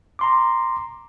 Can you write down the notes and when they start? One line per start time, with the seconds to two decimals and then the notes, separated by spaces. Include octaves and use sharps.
0.19 A#5 C6 D6